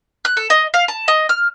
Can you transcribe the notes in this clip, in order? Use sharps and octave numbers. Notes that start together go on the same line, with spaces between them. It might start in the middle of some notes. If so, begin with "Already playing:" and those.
F#6
A4
D#5
F5
A5
D#5
F6